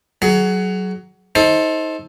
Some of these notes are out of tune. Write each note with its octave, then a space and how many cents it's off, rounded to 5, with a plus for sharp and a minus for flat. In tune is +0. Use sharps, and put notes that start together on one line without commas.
F#3 +15 G#4 +30
D#4 +30 A4 +0 C5 +20